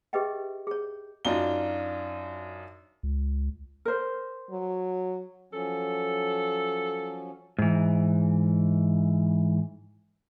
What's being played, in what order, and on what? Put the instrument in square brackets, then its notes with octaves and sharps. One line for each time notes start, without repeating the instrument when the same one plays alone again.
[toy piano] G4 G#4 B4 D#5 E5 G5
G#4 C#5
[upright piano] F#2 D4 D#4 F4 G7
[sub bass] C#2
[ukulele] A#4 C5
[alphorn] F#3
[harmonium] F3 F#3 C#4 [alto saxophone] A4
[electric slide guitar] G#2 E3